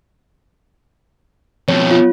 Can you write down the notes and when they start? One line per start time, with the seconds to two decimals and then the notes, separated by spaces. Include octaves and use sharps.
1.68 F2 B2 C#5
1.91 F4